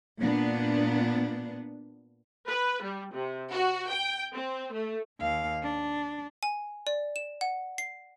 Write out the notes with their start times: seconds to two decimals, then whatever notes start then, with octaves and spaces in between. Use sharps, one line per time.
0.20 A#2 B3 D4
2.48 B4
2.83 G3
3.13 C3
3.52 F#4
3.89 G5
4.34 C4
4.74 A3
5.20 D#2 F5
5.62 D4
6.43 G#5
6.87 D5
7.16 E7
7.41 F#5
7.78 C7